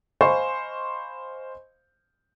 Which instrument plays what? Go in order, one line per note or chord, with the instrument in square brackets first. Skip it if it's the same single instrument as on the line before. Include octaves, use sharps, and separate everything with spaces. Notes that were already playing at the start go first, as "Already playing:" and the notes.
[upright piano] C5 D#5 F5 G#5 B5 C#6